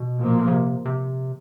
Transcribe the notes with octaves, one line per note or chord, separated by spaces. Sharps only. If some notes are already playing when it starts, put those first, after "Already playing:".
Already playing: B2
A#2 F3 A#3
C#3
C3
C3